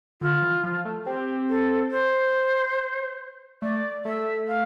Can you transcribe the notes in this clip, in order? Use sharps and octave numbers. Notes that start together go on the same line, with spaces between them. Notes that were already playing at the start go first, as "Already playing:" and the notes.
D3 F4
E3
F3
A3
C4 G4
A4
C5
A3 D5
A3 E5
F5